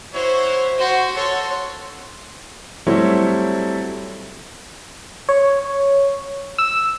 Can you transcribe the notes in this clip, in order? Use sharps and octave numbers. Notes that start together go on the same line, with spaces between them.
E4 F#4 C5 C#5
F#4 C5
F#4 A4 C#5 C6
F#3 G3 A3 C4 E4 C#5
C#5
E6